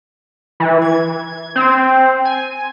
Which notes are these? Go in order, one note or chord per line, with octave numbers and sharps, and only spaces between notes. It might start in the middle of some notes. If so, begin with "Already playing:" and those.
E3
G#6
C4
G#5